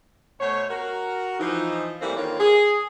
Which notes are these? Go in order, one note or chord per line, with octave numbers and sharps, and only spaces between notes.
B2 A3 C5 C#5
F#4 A#4
E3 F3 D#4
A2 E3 G3 A#3 C4
D3 D#3 A#3 F4 B4 C#5
G#4